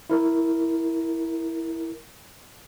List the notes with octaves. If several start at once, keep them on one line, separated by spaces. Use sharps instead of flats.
E4 A#4